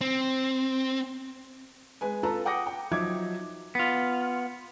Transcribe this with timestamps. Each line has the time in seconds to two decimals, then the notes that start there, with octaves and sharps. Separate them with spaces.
0.01 C4
2.01 G#3 B4 G#5
2.23 F4 A4 B4 F5 A5 A#5
2.45 F#5 G5 D6 D#6 A#6 C#7
2.66 G5
2.91 F3 F#3 D#4 E5 D6 G#6
3.75 B3 F4